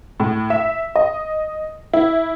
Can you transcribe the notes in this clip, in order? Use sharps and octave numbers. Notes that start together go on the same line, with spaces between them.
A2
E5
D#5
E4